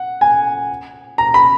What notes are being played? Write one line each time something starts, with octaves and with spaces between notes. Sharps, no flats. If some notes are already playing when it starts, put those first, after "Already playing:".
Already playing: F#5
G#5
A#5
B5